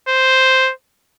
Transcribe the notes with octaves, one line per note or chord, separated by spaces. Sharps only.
C5